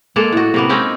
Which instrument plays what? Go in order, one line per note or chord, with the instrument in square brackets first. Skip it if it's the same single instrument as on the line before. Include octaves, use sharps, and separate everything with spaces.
[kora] G#3 A#3 G#4 A4
A2 F#4
C3 A#3 B3
G#3 C4 C#4 D#4